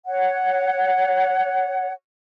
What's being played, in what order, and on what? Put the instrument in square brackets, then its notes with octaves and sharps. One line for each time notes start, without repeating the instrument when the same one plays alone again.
[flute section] C#5 F#5